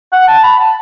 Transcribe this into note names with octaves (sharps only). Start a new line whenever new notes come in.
F#5
A5
B5
A5